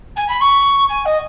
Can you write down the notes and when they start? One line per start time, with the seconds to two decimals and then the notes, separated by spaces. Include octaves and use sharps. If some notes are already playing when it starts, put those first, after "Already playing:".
0.16 G#5
0.28 B5
0.40 C#6
0.89 G#5
1.05 D#5